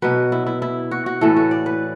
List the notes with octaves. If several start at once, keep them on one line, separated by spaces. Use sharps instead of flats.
B2 F#3 B4
E4
E4
E4
F#4
F#4
A2 E3 A4
F#4
D5
B4